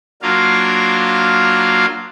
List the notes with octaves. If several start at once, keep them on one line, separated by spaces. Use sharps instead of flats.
F#3 A#3 D4 F4 A#4 F5